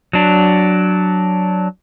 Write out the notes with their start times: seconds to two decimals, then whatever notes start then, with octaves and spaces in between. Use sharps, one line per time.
0.13 F#3 D4